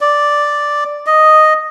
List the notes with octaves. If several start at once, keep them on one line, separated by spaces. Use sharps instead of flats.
D5
D#5